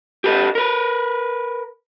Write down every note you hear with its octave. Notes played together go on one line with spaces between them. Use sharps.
G4 A4 B4 C5 D#5
A#4 B4